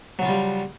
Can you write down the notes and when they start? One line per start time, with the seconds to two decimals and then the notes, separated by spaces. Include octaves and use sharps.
0.19 F#3
0.22 C#3
0.25 F4
0.29 G3